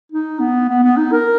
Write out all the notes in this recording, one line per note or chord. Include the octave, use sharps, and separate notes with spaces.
D#4
B3
B3
B3
D#4
A#4